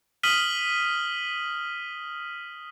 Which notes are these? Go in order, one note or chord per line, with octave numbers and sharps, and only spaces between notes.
D#6 F6 B6 D#7 F#7 G7